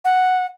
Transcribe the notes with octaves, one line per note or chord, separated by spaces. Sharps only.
F#5